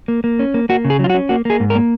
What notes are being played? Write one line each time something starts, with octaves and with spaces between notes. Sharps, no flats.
A#3
A#3
C#4
A#3
A#3 F#4
C#3
G#4
F#3 F4
F#4
C#4
A#3 F#4
A#3 G#4
G#2
A#4
A#3